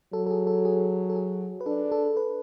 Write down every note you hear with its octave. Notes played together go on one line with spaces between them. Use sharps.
F#3 A4
A4
G#4
A4
G#4
A4
G#4
B4
D4 A4
A4
B4